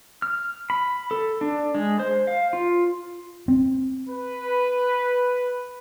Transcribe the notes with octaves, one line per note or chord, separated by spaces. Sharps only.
F6
B5
A4
D4
G#3
C5
F5
F4
C4
B4